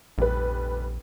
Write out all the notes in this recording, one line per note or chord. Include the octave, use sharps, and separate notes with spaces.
F1 A#1 G3 B4